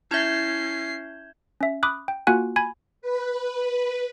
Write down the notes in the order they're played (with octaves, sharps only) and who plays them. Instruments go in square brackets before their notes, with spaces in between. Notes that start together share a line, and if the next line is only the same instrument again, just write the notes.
[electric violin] C#4 C7 [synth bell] E4 E5 [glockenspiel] G6 G#6 E7
[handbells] C#4 E5
B5 D6 D#6 F#6
G5
A#3 F4 F#4 F#5 G#5 F#6
G#5 B5 G#6
[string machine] B4